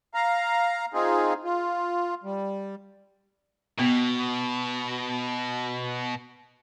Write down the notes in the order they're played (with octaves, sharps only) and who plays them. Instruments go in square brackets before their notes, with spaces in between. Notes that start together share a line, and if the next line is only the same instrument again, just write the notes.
[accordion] F5 A#5
C4 D#4 F4 G#4
F4
G3
[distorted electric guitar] B2 [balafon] B3